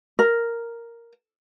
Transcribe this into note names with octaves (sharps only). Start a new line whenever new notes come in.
A#4